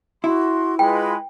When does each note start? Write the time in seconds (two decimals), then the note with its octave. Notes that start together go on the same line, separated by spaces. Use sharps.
0.24 E4 F#4 C6
0.79 G#3 F4 B4 G5 B5 D6